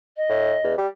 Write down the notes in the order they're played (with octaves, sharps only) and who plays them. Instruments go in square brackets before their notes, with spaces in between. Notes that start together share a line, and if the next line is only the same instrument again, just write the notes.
[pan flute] D#5
[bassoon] A2
E2
G3